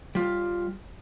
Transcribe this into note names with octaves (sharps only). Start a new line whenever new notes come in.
G3 F4